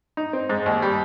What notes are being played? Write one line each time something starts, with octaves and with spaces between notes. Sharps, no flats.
D#4
C4
G#2
D#2
G3